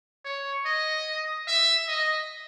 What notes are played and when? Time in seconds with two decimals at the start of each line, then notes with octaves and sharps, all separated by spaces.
0.25 C#5
0.66 D#5
1.48 E5
1.88 D#5